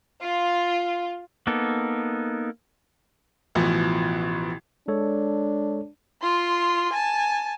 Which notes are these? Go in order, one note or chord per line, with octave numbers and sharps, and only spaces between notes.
F4
A#3 B3 D#4 A4
A1 B2 E3 F3
G#3 D4 A4 C#5
F4 C6
G#5 A5